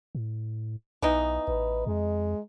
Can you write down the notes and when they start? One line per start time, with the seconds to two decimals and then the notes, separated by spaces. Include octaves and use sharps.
0.15 A2
1.02 B1 E3 B3 D#4
1.48 A1 B4
1.86 F2 G#3